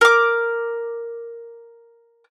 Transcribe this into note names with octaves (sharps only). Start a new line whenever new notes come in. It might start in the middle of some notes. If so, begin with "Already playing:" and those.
A#4 D6